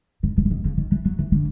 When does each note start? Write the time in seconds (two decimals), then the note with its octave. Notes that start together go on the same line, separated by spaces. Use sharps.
0.23 G#2
0.37 A2
0.45 C3
0.51 B2
0.65 C#3
0.77 D#3
0.91 E3
1.05 F#3
1.19 E3
1.32 D3